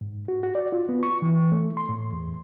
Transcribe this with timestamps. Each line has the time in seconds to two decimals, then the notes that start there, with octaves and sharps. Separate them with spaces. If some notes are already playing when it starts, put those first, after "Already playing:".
0.01 G#2
0.28 F#4
0.43 F#4
0.55 D5
0.72 F4
0.89 B3
1.03 C#6
1.22 E3
1.52 A3
1.77 C6
1.89 A2
2.12 E2